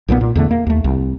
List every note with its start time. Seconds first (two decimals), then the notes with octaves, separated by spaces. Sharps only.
0.08 B1 A#2 F3 B3
0.21 A#2
0.35 E2 D3 A3
0.51 A#3
0.66 D#2 A3
0.84 C2